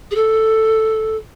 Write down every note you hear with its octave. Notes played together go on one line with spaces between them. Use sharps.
G#4
A4